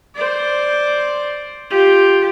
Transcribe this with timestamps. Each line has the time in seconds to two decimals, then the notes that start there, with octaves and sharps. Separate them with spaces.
0.15 C5 D5
1.70 F4 G4